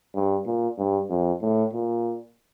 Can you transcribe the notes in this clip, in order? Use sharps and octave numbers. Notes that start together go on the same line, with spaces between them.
G2
A#2
G2
F2
A2
A#2